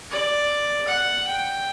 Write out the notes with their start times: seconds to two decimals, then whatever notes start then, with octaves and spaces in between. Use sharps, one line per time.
0.11 D5
0.88 F#5
1.28 G5